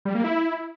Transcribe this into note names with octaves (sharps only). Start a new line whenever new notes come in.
G3
A#3
E4